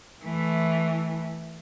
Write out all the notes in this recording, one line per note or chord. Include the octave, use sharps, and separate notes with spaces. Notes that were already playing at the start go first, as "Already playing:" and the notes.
E3 A3